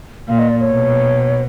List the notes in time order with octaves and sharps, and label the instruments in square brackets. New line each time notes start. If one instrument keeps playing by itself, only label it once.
[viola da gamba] A#2 [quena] F5
[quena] D#5
D5
C#5
[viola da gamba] B2